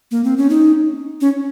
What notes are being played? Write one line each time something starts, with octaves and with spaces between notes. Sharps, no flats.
A#3
C4
C#4
D#4
C#4